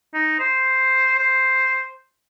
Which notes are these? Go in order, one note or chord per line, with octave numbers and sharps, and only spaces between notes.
D#4
C5
C5